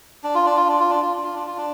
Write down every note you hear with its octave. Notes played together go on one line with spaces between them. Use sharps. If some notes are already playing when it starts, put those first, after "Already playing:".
D4
F4
D4
F4
D4
F4
D4
F4
D4
F4
D4
F4
D4